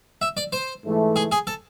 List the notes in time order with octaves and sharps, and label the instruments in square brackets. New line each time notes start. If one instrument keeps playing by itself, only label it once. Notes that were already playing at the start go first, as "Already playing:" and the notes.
[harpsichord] E5
D5
C5
[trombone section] G#2 E3 A3
[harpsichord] G#4
G#4
A4